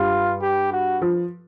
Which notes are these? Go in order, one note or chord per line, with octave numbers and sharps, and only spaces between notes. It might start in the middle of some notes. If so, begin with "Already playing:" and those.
Already playing: G2 G3 F4
G4
F#4
F3